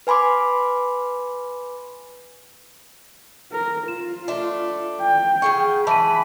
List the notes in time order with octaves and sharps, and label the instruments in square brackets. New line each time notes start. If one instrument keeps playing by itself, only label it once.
[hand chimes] B4 G#5 B5 C6 D6
[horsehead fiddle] A#4
[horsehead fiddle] F4 [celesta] E7
[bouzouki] A3 D4
[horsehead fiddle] G5
[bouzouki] C#3 G#4 F#5 [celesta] C#6
[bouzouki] E3 [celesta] A5 D#7 [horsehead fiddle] B5